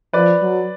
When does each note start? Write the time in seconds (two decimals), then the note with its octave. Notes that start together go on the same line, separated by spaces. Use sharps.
0.13 F3 B4 D5
0.42 F#3